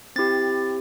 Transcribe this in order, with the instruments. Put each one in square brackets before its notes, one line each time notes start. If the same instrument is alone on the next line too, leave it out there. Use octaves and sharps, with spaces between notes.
[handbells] C4 E4 G4 A6